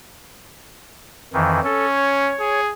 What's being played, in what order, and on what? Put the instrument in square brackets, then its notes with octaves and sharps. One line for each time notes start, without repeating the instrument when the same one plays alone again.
[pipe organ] F2 D#3 E3
[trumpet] C#4 [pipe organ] A4
[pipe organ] C#5
[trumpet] G#4